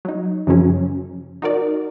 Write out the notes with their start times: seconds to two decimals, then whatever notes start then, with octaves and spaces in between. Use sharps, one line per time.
0.05 F#3 D#4
0.47 F#2 C#3 F3 F#3 C#4
1.42 D#4 F#4 A#4 D5